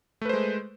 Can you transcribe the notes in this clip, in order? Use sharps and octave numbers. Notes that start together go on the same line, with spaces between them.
G#3 A3 B4 C5